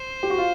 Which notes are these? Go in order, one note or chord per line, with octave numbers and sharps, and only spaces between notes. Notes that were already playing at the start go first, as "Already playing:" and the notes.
Already playing: C5
G4
F#4
F4